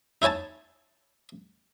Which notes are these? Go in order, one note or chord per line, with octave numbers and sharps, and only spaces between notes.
D#4 E4 C#5 G#5 A5